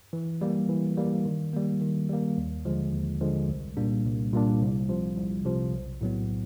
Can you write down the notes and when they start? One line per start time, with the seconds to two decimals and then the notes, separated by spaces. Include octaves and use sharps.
0.13 E3
0.41 G3 A#3
0.69 E3
0.97 G3 A#3
1.26 D#3
1.53 G3 A#3
1.81 D#3
2.09 G3 A#3
2.37 D#2
2.65 D3 F3 G#3
2.93 D#2
3.21 D3 F3 G#3
3.49 C2
3.77 A#2 G3 A#3 D4
4.05 C2
4.33 A#2 G3 A#3 D4
4.61 C2
4.89 C3 F3
5.17 C2
5.45 C3 F3
5.73 B1
6.01 A2 F#3 B3